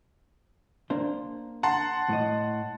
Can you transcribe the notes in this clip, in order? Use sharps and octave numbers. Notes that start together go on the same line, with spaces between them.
A#3 D4 C5
F#5 A5 A#5 C6
A2 D#5